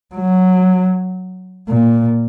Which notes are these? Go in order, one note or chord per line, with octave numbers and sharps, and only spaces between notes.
F#3
A#2